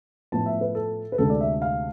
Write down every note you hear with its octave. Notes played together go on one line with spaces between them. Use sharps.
A2 F3 B3 A5
E5
B4
A4
B4
D2 C3 G#3 D4 A4
D5
E5
F5